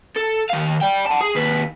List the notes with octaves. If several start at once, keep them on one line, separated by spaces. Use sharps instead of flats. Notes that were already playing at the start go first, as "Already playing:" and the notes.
A4
D#3 F5
D5 G5
F#5 A5
G#4
D#2 B4